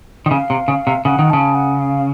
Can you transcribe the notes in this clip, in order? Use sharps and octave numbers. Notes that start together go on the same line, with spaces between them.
D#3
C#3 F5
C3
C#3
C3
C#3 F#5
D#3
C#3 A5
F#5
F5